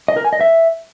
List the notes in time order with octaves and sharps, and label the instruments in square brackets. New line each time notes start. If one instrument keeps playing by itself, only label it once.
[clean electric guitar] D#5
A#4
G#5
D#5
E5